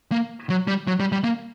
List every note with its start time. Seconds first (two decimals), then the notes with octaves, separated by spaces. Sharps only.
0.12 A#3
0.50 F#3
0.67 G3
0.87 F#3
1.00 G3
1.12 G3
1.24 A#3